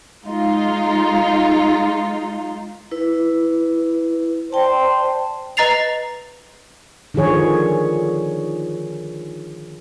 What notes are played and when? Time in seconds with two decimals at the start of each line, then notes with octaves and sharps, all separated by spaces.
0.24 G#3 D#4 F4
2.91 E4 B4
4.53 C5 D5 G5 A5
5.57 B4 D#5 A#5 A6 C7 F7
7.14 D3 D#3 F3 G#4 C#5